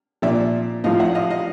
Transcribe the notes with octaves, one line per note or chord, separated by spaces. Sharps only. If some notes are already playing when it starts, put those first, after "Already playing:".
A#2 F3 D5 E5
A2 F3 D#5 F5
E5 F#5
D#5 F5
D#5 F5